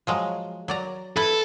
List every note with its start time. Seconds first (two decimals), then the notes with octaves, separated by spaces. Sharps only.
0.07 F3 F#3 G#3
0.68 F#3 D5 A#5
1.17 E4 A4 B4